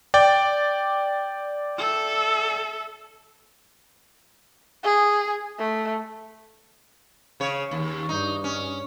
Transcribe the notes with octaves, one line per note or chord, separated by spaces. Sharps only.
D5 G5
A4 E5
G#4
A3
C#3 C#5
D#2
G2 D#4
C#4